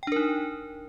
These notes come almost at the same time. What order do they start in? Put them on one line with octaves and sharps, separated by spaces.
G5 D4 A#4 D#4